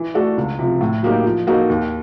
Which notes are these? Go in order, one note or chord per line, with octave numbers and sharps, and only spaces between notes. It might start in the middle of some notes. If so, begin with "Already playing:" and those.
Already playing: E3
A3 D4 F#4 A4
C#2
C3 F3
A2
F#3 A#3 D#4 G4
F3
A#3 D#4 F#4 A4
D#2